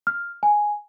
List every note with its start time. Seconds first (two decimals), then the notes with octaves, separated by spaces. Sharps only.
0.07 F6
0.43 G#5